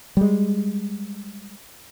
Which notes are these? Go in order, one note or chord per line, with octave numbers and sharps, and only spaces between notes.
G3 G#3